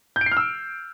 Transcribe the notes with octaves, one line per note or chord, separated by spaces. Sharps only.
G6
D7
C7
F6
E6